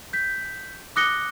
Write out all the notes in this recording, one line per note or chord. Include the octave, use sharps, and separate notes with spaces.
G6 B6
D6 D#6 F#6 A#6 C#7 G7